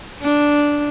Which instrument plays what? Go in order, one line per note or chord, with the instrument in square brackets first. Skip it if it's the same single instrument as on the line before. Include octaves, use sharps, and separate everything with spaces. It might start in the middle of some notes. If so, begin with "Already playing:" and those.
[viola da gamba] D4